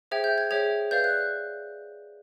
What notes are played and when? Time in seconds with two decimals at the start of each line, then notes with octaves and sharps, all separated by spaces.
0.11 G#4 C5 E5 G5 G#6
0.24 G6
0.38 G#6
0.51 G#4 C#5 E5 G5 G#6
0.91 B4 D5 F5 G6
1.04 F#6